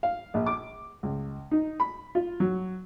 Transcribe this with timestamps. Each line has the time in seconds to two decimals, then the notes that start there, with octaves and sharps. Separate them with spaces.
0.03 F5
0.34 A#1
0.46 D6
1.03 C#2
1.51 D#4
1.80 B5
2.15 F4
2.40 F#3